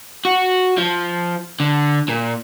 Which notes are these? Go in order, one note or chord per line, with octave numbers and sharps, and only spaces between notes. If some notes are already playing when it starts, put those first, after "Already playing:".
F#4
F3
D3
A#2